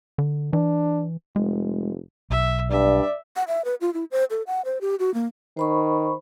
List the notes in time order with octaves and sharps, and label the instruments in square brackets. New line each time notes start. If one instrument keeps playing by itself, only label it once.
[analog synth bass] D3
[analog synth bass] E3 [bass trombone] D4
[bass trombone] F1 [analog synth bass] G#3
[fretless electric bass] B1 [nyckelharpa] E5
[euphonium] G2 [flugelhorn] D5 [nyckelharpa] E5
[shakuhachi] F#5
E5
B4
F4
E4
C5
A4
F#5
C5
G4
F#4
A#3
[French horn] D#3 [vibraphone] C5 B5 C#6